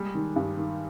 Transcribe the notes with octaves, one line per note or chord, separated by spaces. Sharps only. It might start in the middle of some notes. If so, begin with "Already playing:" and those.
Already playing: G3 G#3
D#3
G2
D#3